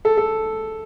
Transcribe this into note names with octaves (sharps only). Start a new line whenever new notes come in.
A4
A4